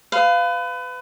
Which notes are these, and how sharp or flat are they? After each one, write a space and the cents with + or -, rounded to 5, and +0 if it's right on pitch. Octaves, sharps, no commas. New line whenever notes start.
B4 +30 F5 +0